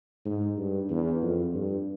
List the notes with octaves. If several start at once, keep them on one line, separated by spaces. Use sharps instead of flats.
G#2
G2
E2
F2
G2